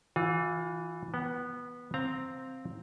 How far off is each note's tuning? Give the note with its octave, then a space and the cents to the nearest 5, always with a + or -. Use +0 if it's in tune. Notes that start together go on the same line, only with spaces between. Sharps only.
E3 +0 F4 +35
B3 -15 F#5 +40
C4 +0 F5 +10 A#5 +0